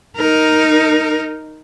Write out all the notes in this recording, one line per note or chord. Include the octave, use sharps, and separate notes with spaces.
D#4 A#4